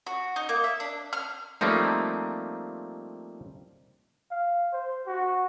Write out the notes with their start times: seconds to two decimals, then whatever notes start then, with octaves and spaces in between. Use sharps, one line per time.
0.07 F#4
0.36 D#4
0.49 A#3
0.64 E5
0.80 D4
1.13 F6
1.61 F3 G3 A3 A#3 C4 D#4
4.31 F5
4.73 C5
5.07 F#4